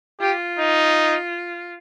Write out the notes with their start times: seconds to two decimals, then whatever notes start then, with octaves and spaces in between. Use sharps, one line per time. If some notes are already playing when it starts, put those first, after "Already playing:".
0.20 F4 G4
0.59 D#4